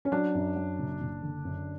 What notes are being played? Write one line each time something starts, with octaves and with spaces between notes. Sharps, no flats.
C#4
F#3 D4
F#2
F#3
F#1
F#1
D3
F#2